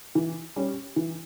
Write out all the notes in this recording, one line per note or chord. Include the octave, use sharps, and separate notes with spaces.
E3
G3 C#4 G4
E3